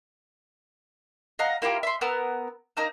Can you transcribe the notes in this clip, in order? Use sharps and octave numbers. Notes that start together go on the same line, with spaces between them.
D#5 F5 F#5 A#5
A#3 E4 F4 G4
E5 C6
B3 A#4 E6
A#3 D#4 A#5 E6